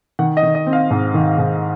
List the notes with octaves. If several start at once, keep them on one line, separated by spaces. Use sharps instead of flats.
D#3 F#5
D#5
D#3
D#5
C4
F5
G#2
D#3
G#2